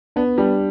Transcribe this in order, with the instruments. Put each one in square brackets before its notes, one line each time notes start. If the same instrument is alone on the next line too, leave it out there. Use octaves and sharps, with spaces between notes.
[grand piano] B3 [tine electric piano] D4
[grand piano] G3 [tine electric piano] D4